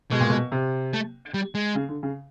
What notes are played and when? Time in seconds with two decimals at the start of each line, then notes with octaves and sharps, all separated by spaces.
0.11 B2 G#3
0.20 A#2
0.30 B2
0.52 C3
0.93 A3
1.34 G3
1.55 G#3
1.75 C#3
1.89 D3
2.03 C#3